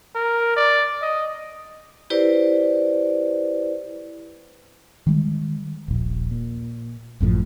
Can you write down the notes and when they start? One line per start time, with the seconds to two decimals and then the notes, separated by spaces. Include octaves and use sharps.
0.15 A#4
0.56 D5
1.02 D#5
2.10 E4 G4 B4 C5 D5
5.07 D#3 G3 G#3
5.88 D#1 A#1
6.31 A#2
7.20 G#1 F#2 A2 F3